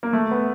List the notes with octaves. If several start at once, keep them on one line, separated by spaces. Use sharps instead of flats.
A#3
A3
B3